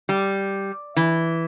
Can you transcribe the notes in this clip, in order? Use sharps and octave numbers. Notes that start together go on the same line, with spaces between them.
G3
E3